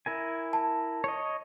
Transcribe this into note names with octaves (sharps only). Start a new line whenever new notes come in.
E4 A#4 G#5
A5
C#5 D#5